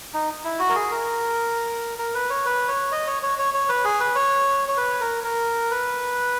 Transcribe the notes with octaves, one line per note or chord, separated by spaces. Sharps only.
D#4
E4
F#4
A#4
G#4
A#4
A#4
B4
C#5
B4
C#5
D#5
C#5
C#5
C#5
C#5
B4
G#4
B4
C#5
C#5
B4
A#4
A#4
B4